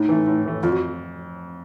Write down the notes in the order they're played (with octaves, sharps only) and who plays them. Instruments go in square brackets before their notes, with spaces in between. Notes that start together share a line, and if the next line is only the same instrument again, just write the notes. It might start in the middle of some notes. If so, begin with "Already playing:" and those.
Already playing: [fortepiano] A2 [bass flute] D#4
[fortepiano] E3 A3
A2
E3 A3
[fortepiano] F2 [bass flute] F4
[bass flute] F#4